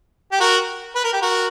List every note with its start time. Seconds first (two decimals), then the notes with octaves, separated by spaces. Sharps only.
0.32 G4
0.40 F#4 A#4
0.95 B4
1.04 A#4
1.13 G4
1.22 F#4 A#4